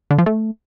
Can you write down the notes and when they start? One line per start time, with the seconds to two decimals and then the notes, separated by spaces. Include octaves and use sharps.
0.11 D3
0.18 F3
0.26 A3